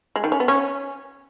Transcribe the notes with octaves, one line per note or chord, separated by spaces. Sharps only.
G#3
D#3
C#4
B3
C#4